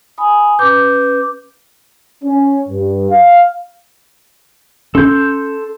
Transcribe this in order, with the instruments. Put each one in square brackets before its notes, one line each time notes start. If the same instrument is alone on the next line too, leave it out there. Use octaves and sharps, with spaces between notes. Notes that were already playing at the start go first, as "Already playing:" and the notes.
[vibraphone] G#5 B5 D#6
[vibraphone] C#4 B4 [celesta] D6 G6
[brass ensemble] C#4
G2
F5
[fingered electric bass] C#4 [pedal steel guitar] A4 C6 G6